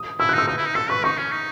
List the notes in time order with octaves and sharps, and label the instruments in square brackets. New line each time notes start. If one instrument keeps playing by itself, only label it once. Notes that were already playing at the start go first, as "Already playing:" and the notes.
Already playing: [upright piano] D#6
[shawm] E4 [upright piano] E6
[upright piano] F#6
[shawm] D#4 [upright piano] E6
[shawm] D#4 [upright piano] E6
[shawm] E4
D#4
[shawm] A4 [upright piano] E6
[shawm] B4 [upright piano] C#6
[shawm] D#4 [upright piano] C#6
[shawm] C#4
D#4